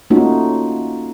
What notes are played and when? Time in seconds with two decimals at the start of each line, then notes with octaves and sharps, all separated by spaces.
0.10 A3 A#3 C#4 D#4 F4 F#4